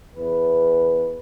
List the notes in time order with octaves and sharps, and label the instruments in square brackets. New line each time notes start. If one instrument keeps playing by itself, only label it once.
[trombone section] E2 B4